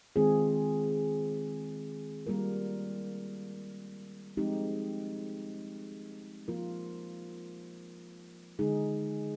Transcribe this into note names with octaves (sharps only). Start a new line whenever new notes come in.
D#3 G#3 C4 F4 G#4
G3 A#3 F4 A#4
F3 G#3 C4 D#4 G4
F3 A#3 F4 A#4
D3 G#3 D#4 G#4